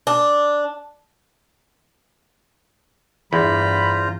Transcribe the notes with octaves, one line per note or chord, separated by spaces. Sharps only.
D4
E2 G2 F4 C5 A#5 B5